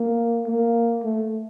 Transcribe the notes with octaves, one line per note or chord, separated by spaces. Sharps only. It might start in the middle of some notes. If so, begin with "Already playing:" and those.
Already playing: A#3
A#3
A3